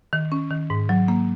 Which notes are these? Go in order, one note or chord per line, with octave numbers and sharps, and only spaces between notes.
D#3
C#4
D#3
G#2
F#3
A#3